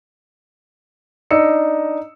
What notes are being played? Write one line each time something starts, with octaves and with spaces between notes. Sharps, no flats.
D4 D#4 D#5 E6 C#7